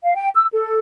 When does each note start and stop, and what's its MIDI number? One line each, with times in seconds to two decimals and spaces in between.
0.04 0.14 77
0.15 0.29 79
0.35 0.46 88
0.53 0.79 69